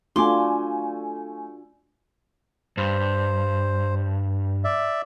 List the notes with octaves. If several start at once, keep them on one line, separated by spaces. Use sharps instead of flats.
A3 D4 F4 F#4 G#5 C6 D6
G2 C5
D5 E5